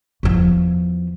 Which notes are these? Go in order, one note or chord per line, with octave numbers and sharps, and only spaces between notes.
E2 F3